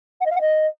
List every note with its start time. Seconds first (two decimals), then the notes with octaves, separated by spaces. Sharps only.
0.20 F#5
0.25 D#5
0.30 F5
0.35 F#5
0.40 D#5